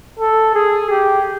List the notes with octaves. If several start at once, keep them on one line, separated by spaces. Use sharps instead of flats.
A4
G#4
G4